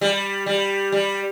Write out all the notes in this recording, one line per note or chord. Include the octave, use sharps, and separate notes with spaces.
G3
G3
G3